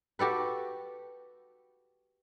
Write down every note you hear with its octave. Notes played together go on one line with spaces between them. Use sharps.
F#4 G4 A4 B4